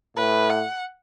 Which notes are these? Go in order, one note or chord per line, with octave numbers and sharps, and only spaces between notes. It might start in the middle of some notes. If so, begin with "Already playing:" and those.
A2 B4
F#5